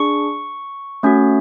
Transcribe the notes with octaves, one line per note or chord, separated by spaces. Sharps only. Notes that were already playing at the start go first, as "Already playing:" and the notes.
Already playing: D4 G#4 C#6
A3 C#4 F#4